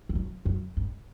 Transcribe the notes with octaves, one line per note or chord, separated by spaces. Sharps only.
F2
F#2
F#2
G2